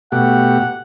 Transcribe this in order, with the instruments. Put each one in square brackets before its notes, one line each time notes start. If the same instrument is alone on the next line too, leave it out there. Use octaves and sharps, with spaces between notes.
[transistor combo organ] B2 A3 G4 [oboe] F#5